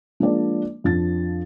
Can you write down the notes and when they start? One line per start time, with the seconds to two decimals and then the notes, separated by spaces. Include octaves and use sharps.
0.20 F3 G#3 A#3 D4 D5
0.84 F2 F3 D4 A6